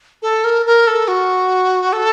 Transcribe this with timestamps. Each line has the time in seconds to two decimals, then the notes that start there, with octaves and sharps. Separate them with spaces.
0.22 A4
0.44 A#4
0.66 A#4
0.87 A4
1.08 F#4
1.93 A4